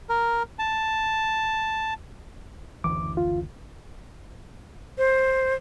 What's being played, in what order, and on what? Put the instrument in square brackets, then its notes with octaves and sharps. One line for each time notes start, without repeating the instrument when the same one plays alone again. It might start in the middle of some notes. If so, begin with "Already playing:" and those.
[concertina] A#4
A5
[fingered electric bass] F#1 D2 E3 [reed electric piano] D6
[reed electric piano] F4
[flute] C5